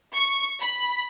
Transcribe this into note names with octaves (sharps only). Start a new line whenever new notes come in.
C#6
B5